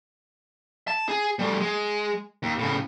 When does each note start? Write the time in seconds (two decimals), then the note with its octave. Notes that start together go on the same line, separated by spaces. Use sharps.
0.88 A5
1.09 G#4
1.39 G3 A3
1.61 G#3
2.43 D#2
2.59 A2 C#3